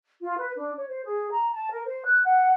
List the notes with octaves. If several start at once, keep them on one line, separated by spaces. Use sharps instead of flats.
F4
B4
D4
C#5
C5
G#4
A#5
A5
A#4
C5
F#6
F#5